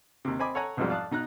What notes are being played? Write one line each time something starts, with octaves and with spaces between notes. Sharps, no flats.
D#2 C3
C4 D#5 G#5 B5 D6
A4 C#5 F#5 G#5 A#5
B1 F2 G#2 F3 G3
D5 F5 A5 D#6 F#6
B2 D#4 A#5 F#6